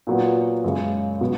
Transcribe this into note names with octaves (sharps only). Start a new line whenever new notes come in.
A#2 F#3 B3
F#2 C#3 G#3
B2 F#3 B3